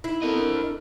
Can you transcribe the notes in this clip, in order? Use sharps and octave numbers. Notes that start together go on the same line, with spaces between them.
D#4 E4
B3 C4 A4 A#4 D#5
D4